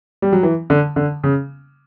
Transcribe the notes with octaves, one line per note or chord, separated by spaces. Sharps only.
G3
F#3
E3
D3
D3
C#3